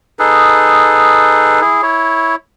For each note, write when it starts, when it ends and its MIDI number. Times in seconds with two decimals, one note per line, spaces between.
0.19 1.61 63
0.19 1.61 68
0.19 1.61 69
0.19 1.61 71
1.61 1.82 64
1.61 1.82 68
1.83 2.35 64
1.83 2.35 73